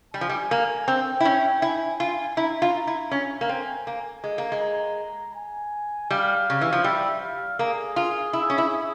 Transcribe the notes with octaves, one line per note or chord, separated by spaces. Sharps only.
G3 G#5
F3
G3
A#3
C4 G5
E4
C#4
E4 G#5
F4
E4 A#5
F4
E4
C#4 G#5
A#3
C4
A#3
G#3
A#3
G#3
A#5
G#5
G3 F5
C#3
E3
F3
G3 E5
F5
A#3 G#4
F4
E4
C#4
E4